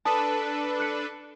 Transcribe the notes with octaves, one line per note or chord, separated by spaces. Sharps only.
D4 A4 B4 A5 D#6
F#6 C#7